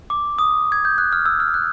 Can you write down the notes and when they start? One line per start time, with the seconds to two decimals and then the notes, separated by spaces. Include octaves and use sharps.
0.10 D6
0.39 D#6
0.72 G#6
0.85 G6
0.98 F#6
1.12 F6
1.26 E6
1.40 F6
1.54 F#6